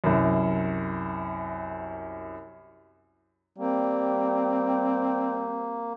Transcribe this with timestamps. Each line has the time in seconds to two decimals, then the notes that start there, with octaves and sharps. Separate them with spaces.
0.04 C2 F#2
3.58 G3 A#3 C4